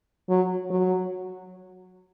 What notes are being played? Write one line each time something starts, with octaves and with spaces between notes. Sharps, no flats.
F#3
F#3